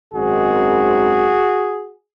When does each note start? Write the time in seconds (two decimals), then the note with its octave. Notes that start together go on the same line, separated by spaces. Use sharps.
0.14 G#1 F#2 D#3 G#3 C4 F#4 G#4